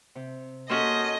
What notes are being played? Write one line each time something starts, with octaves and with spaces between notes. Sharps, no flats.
C3
A#3 C#4 F#4 G4 A4 C5 D#5